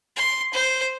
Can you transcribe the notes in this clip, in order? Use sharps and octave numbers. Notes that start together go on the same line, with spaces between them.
C6
C5